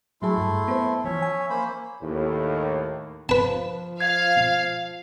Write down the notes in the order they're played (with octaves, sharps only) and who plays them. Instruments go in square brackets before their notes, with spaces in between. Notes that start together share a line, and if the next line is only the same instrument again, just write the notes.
[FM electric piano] A2 F#3 G#4 [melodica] A3 E4 C6
[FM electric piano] G2
B3 C5
[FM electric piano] E3 F3 [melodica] C#4 C#5 E5
[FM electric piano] G#5
[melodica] A#3 C5 B5
[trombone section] D#2 A2
[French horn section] F3 [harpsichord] B4 A5
[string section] F5 [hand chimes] G#6